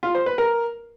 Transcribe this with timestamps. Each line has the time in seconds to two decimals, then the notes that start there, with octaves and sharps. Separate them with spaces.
0.03 F4
0.15 C5
0.26 B4
0.38 A#4